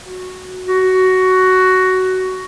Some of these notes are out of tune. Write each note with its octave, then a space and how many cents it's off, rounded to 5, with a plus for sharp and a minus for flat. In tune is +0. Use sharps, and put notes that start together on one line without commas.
F#4 -5
F#4 +10